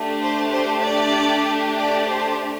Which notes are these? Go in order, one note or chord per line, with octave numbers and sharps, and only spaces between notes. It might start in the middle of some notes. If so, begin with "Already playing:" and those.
Already playing: A3 D4 G4
C5
C5
D5
D5
C5